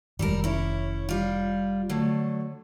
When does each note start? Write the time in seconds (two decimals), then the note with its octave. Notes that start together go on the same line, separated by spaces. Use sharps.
0.19 F1 D#3 G3 G#3 A4 A#4
0.44 C#4 E4
1.09 G3 F4
1.89 D3 F#3 A3